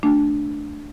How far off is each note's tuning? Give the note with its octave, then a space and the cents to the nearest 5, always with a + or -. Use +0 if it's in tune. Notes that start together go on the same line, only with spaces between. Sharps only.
A3 -5 D4 -5